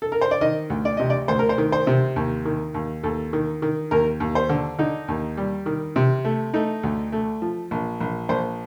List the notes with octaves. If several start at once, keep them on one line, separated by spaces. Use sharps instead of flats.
A4
A#4
C5
D5
D#3 D#5
D2
D5
C3 D#5
D5
D2 C5
A#4
C5
D#3
C5
C3
D#2
D#3
D#2
D#2 A4
D#3
D#3
D#2 A#4
D#2
C5
D3
D3 D#4
D#2
G3
D#3
C3
A3
A3 D#4
D2
A3
F3
A#1
A#1
A#1 C5